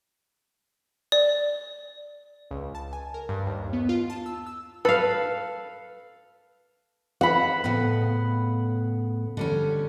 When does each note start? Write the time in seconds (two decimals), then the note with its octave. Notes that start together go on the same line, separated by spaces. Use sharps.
1.12 D5
2.51 C#2
2.75 A5
2.93 G#5
3.14 A#4
3.29 G2
3.46 D#2
3.73 B3
3.89 F4
4.10 A5
4.26 E6
4.46 E6
4.85 A4 B4 F5
7.21 C4 F#5 B5
7.64 A2 C#3 B3
9.37 D3 G3 C#4